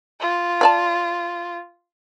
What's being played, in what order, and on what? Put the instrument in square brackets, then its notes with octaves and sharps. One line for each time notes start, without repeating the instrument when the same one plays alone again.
[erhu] F4
[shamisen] C4 D5 A5